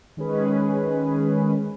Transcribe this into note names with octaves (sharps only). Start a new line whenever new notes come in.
D#3 G#3 C#4 G#4 B4